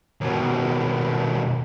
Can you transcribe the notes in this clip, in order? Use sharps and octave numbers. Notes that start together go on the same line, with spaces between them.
D#2 B2